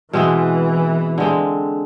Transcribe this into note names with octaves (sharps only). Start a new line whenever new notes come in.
B2 E3 G#3 C4 E4
D3 G#3 C4